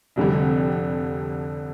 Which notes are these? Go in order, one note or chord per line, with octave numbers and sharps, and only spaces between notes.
F1 F2 D3 G3